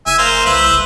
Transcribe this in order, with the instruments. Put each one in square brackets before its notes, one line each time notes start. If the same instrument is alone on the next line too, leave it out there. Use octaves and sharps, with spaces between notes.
[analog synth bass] F#1 [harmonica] E5 G#5
[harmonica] A#3 C5
[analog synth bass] C2 [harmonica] B4 C5 E5
[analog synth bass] F#1